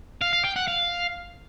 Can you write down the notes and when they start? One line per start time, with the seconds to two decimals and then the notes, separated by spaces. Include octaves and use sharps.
0.22 F5
0.33 F5
0.45 G5
0.56 F#5
0.68 F5